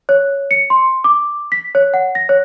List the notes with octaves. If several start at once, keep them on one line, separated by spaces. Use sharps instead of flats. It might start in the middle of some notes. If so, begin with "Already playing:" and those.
C#5
C#7
C6
D6
B6
C#5
F#5
A#6
C#5